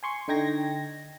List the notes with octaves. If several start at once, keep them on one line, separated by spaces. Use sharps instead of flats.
G#5 C6 C#6
D3 D#4 G5 G#6 A#6